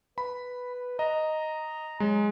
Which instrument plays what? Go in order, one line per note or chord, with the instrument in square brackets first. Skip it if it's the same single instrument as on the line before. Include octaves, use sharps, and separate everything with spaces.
[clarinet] B4 [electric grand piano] B5
[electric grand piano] D#5 [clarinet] A#5
[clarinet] F#3 [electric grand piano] G#3